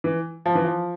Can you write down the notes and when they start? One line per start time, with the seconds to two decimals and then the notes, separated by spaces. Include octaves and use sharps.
0.04 E3
0.46 F3
0.55 E3
0.64 F3